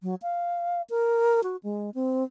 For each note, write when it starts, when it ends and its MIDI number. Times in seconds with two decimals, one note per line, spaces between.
0.03 0.15 54
0.22 0.82 77
0.90 1.43 70
1.43 1.56 66
1.63 1.90 56
1.94 2.24 60